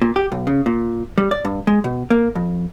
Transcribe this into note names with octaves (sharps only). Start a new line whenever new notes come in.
A#2
G4
B1
C#3
A#2
G3
D5
G2
G#3
B2
A#3
F2